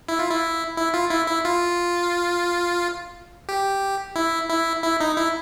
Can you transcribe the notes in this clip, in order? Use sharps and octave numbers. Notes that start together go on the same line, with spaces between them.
E4
F4
E4
E4
F4
E4
E4
F4
G4
E4
E4
E4
D#4
E4